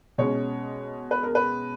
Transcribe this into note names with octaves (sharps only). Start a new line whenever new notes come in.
B2 G#3 C#4 C#5
B4
A#4
B4